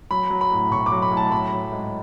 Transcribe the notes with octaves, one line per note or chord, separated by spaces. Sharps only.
F#3 B5
F#3
B5
A2
B1 C#6
D6
F#3
B5
A2
A5
F#3 B5
F#3
G#2